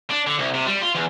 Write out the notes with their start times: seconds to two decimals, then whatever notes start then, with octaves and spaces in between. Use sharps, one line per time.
0.10 D4
0.27 D3
0.39 C2
0.54 C3
0.67 G3
0.81 F4
0.95 E2